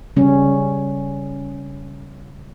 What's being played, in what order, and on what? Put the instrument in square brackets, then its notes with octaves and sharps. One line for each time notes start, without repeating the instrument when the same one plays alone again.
[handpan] C#3 G3 C#4